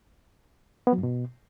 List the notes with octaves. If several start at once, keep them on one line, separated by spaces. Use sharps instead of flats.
B3
F#3
G2
B2